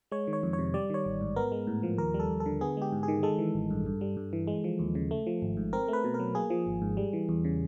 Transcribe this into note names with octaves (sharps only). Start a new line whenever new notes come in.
G#3 C#5
D#3
C#5
F2
C#5
C3
G3 D5
D#3 C#5
A1
G#2
B3 A#4
G#3
A2
F3
D#2 A#4
G3
A4
D#2
A4
D3
B3 G#4
G#3 G4
G#2
G#4
D#3
G#3 A4
E3
A1
G2
G2
G3
G2
E3
G#3
F3
D#2
C#3
A3
F3
G#1
G#2
C4 A#4
A3
B4
B2
A#4
F#3
A#3 G#4
F3
G#1
G#2
G3
E3
E2
C#3